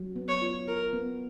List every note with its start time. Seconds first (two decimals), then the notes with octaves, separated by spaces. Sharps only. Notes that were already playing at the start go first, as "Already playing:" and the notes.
Already playing: F#3
0.16 B3
0.28 C#5
0.42 F4
0.67 F4 A#4
0.93 B3